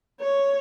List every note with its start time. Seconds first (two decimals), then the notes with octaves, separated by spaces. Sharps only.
0.21 C#5